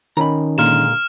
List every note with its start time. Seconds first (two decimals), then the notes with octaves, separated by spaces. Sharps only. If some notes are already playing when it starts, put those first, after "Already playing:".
0.17 D#3 C#4 D#4 A#5 B5
0.58 A#2 D3 G#3 F6 E7